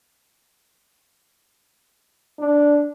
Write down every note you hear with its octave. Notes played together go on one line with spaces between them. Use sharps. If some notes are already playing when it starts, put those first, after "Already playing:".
D4